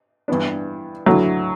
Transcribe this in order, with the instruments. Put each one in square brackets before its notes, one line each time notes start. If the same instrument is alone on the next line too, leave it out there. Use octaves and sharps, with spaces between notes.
[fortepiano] G2 E3 B3 D4
[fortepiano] D2 D3 A3 E4 [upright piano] F#3